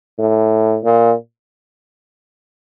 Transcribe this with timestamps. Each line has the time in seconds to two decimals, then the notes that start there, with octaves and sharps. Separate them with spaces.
0.18 A2
0.84 A#2